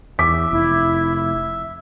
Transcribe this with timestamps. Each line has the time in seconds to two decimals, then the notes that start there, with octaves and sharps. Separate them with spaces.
0.19 E2 E5 D6 B6
0.51 F1 E4